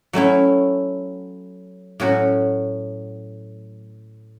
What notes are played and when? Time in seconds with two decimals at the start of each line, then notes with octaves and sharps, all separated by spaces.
0.13 F#3 A3 C#4 E4
2.00 A2 F#3 C#4 F#4